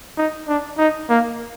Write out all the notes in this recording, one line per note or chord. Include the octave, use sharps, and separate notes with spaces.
D#4
D4
D#4
A#3